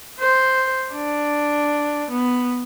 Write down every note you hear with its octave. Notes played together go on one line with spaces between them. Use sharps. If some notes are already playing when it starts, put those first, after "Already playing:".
C5
D4
B3